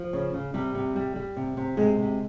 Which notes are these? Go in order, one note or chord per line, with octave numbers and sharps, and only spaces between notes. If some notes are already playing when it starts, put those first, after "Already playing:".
Already playing: F3
C#3
C#3
C3 G3
C3
G3
G3
C3
C3
C3 G#3
C3